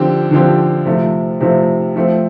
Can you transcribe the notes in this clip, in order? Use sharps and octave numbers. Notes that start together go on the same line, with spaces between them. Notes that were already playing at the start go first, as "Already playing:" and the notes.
Already playing: D3 F3 C4 G4
D3 F3 C4 G4
C3 F3 A3
C3 F3 A3
F3 A3 C4